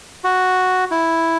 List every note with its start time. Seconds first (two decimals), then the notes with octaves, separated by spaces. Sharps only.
0.24 F#4
0.91 E4